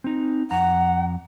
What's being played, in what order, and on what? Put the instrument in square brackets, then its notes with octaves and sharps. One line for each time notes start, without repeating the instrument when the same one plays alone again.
[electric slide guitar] C4 D#4
[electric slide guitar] F2 A#5 [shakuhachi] F#5